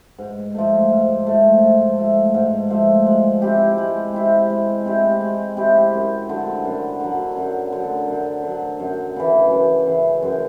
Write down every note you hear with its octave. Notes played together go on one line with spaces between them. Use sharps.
G#2
F3 A3
G#2
F3 A3
G#2
F3 A3
G#2
F3 A3
G#3
C4 E4 G4
G#3
C4 E4 G4
G#3
C4 E4 G4
G#3
C4 E4 G4
F#2
D3 F#3
F#2
D3 F#3
F#2
D3 F#3
F#2
D3 F#3
F#2
C#3 E3
F#2
C#3 E3
F#2